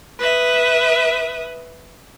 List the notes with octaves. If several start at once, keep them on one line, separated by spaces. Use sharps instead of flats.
B4 E5 D#6